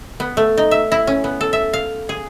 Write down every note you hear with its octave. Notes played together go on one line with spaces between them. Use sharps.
B3
A3
D#4
E5
E4
C#4
B3
A4
E5
F5
G#4